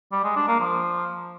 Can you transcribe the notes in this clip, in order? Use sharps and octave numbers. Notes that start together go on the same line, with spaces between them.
G3
G#3
D4
A#3
F3